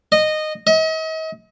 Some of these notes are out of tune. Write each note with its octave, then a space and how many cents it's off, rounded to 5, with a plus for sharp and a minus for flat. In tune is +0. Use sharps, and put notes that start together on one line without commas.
D#5 -15
D#5 +40